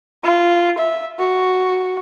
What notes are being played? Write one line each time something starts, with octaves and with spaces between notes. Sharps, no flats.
F4
E5
F#4